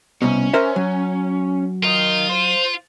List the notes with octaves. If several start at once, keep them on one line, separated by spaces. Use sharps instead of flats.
C2 B2 C#4
A#4 C5 E5
F#3
F4 A#4 D#5
C5